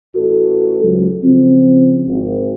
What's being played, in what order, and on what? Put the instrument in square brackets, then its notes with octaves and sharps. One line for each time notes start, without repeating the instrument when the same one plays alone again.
[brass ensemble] A1 F#4 A4
C#2 G#2 F#3
C#3 F3 C4
G#1